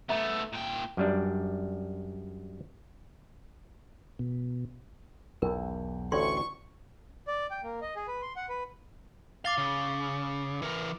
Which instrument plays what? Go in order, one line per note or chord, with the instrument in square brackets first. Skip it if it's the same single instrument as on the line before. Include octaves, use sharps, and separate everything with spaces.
[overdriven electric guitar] A3 B3 [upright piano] E5 A#5
[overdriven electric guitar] A#2 G5
[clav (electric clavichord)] F#2 G3 D4
[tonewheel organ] B2
[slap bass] B1 E2 [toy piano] A#4
[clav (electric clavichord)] A1 D2 A2 [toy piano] D5 C6 [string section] C#6
[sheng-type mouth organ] D5
G5
A#3
D#5
G#4
B4
C6
F#5
B4
[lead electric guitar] F5 [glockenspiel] D6 A6 G7
[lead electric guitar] C#3
E3 A#4